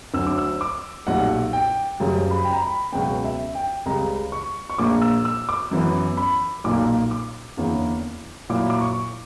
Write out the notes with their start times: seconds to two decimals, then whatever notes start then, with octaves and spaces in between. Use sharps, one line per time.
0.14 D2 D3 F#3 E6
0.27 D6
0.38 E6
0.61 D6
1.07 B1 A#2 G3 F#5
1.53 G5
2.00 F#1 F#2 C#3 G3 C#4
2.31 B5
2.45 G5
2.53 A#5
2.62 B5
2.92 C#2 B2 F#3 B3 G5
3.24 E5
3.55 G5
3.86 C#2 C#3 G3 A#5
4.32 C#6
4.70 C#6
4.78 A#1 A#2 A#3 D6
5.02 E6
5.25 E6
5.49 D6
5.71 F#2 E3 B3 E4
6.17 B5
6.64 B1 A#2 A#3 D6
7.11 D6
7.57 E2 D3 A#3 C#4 E4
8.50 A#2 F#3 A#3 E4 D6
8.70 D6
8.81 C#6